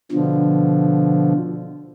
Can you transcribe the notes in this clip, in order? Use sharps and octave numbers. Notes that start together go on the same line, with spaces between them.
B2 D3 F3